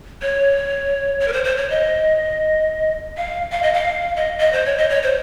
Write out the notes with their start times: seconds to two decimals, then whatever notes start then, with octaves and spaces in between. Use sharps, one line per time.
0.22 C#5
1.20 C#5
1.28 A#4
1.33 C5
1.44 C5
1.57 C#5
1.70 D#5
3.17 F5
3.52 F5
3.63 D#5
3.73 F5
4.16 D#5
4.40 D#5
4.53 C5
4.65 C#5
4.78 D#5
4.89 C#5
5.02 C5